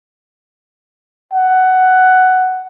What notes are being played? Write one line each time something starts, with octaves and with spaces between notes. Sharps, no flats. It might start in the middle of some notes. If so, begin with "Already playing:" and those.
F#5